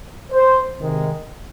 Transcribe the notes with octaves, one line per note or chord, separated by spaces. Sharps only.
C5
C3 D#3 G#3